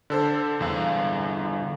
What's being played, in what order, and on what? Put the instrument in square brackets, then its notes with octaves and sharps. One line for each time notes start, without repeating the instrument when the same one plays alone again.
[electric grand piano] D3 A4 C5
[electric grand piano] E2 [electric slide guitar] D3 G3 F5